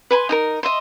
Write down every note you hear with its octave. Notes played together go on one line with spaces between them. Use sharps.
B4 G#5 B5 C6
D#4 A4 A#4
D#5 E5 C6